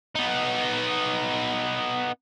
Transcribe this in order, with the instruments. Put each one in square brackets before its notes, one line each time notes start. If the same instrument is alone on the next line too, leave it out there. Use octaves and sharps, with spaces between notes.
[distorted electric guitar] B3 D#4